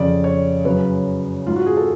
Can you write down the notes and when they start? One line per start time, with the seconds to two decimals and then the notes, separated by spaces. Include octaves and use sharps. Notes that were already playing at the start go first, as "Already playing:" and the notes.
Already playing: F2 C#3 D5
0.24 C#5
0.64 F#2 C#3 B4
1.47 G#2 F4
1.56 F#4
1.66 G#4
1.77 A4